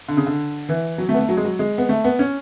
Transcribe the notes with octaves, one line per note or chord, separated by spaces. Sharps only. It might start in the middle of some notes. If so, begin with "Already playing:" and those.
D3
C#3
D3
E3
F#3
A3
B3
A3
F#3
G#3
F#3
G#3
B3
A3
B3
C#4